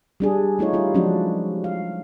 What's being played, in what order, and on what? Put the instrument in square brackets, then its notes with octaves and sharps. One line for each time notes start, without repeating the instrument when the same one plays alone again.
[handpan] G3 D4 G#4
A3 D#4 F4 C#5
G3 E4 F4
F3 F#3 G#3 C#4 D4 F#4
F5